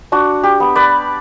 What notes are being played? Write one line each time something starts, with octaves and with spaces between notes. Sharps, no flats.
D4 F#4
G4
B3
B4 D5